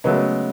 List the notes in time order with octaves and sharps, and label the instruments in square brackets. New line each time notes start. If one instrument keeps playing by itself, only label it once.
[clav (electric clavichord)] C#3 F#3 A3 [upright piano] G#3 B3